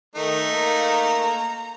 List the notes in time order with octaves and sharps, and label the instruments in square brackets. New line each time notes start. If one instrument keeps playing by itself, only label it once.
[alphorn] D#3 [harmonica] A3 D#4
[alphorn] A#3 [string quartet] A#5